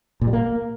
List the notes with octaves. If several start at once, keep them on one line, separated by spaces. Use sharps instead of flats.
A#2
G3
A#3